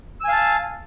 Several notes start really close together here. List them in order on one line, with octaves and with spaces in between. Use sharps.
E6 G#5 F5 A5